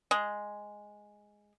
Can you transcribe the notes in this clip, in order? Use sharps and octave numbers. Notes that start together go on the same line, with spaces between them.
G#3